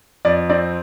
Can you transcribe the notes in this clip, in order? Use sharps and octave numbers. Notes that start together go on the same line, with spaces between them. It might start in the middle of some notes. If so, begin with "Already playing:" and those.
F2 D5
C4 D5